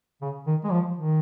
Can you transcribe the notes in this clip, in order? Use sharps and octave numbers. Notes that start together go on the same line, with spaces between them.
C#3
D#3
G#3
F3
D#3